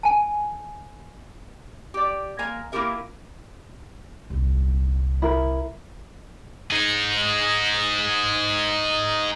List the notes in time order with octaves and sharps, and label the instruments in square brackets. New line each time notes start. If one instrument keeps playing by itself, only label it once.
[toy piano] G#5 A5
[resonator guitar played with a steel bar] G4 D5
G#3 A#3 G#5 A#5
A#3 E4 F4 G4 A#4 E5
[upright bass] D#1 C2
[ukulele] E4 A#4
[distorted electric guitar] D#4 G#4